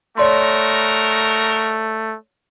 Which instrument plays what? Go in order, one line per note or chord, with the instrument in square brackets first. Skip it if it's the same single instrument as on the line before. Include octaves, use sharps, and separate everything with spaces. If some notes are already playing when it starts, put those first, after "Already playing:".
[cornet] A3 [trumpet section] D#4 F#4 A#4 [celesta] C#5 D5 C6